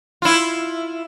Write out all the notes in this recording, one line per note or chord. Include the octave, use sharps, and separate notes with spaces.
E4 F4